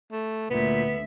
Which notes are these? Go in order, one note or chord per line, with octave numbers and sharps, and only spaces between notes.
A3
D2 A#2 B3 E5